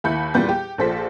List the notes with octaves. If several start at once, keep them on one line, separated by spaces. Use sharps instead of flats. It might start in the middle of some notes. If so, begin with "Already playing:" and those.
D#2 E4 B5 G6 C#7
E2 A#2 G3 B3 G6
G4
A#1 F3 A4 C5 B6